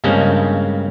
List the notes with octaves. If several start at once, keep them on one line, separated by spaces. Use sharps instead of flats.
G2 C#3 G#3 A#3 C4 C#4